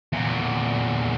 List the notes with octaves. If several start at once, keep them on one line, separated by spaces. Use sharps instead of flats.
E2 A#2